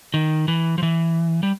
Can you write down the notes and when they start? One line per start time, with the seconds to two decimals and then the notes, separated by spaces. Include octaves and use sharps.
0.14 D#3
0.48 E3
0.78 F3
0.83 E3
1.43 G3